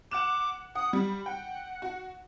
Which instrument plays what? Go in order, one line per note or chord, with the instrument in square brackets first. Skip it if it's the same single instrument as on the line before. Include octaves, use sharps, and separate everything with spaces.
[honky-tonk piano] F#5 F#6 E7 [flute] D6
[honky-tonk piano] F#5 [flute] D#6
[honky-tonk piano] G3 [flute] B5
[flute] F#5 [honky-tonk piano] G5
[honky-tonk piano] F#4